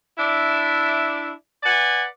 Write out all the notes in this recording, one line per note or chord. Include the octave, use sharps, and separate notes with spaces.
D4 E4 D5 E5
B4 D5 F#5 G#5